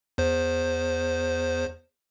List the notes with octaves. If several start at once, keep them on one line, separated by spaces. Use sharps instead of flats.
E2 C5